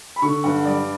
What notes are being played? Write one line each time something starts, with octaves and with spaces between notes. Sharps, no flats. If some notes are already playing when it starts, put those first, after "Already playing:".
B5
D3 C#6
G2 F#5
G3 D5